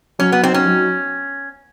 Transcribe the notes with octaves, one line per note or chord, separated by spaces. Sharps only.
F#3 C#4
B3
C4 D#4
C#4
F#3